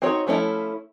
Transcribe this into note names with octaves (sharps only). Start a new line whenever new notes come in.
C4 D#4 F#4 C#5
F3 A3 C#4 D4 E4